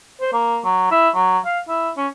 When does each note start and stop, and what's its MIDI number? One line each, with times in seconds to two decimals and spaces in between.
0.21 0.32 72
0.33 0.59 58
0.65 0.91 54
0.91 1.09 64
1.15 1.39 54
1.46 1.60 77
1.68 1.90 64
1.97 2.07 61